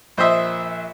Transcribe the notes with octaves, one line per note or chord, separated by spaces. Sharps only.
A#1 C5 D#5 E5